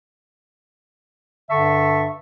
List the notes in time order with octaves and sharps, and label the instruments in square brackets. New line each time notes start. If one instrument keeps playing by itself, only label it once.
[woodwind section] G2 D3 E5 A5 C#6